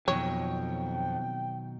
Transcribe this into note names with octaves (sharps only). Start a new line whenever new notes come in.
F2 B2 D#3 F#3 C#5 G5